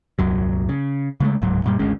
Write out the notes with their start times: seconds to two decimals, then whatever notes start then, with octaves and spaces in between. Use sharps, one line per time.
0.19 D#1 C2 F#2 F#3
0.69 C#3
1.20 C#3 G#3 A3
1.42 D1 C#2 G#2 F#3
1.64 F#2 A#2 G3
1.79 G#1 D2 G#3 C#4